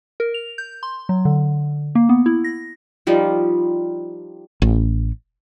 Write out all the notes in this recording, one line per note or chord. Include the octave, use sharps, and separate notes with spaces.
A#4
F7
G6
C6
F#3
D3
A#3
B3
E4
A#6
F3 G3 D#4 F4
A1